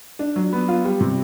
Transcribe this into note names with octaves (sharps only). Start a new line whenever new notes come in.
D4
F#3
B3
F4
G3
C3